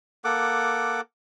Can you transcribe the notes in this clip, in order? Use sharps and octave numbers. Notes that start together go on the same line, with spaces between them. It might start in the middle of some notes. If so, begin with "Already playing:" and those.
A#3 A4 F#5 D6